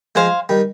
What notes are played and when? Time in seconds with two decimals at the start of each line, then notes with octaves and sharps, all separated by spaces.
0.15 F3 G#3 C5 F5 G#5
0.49 D#3 G3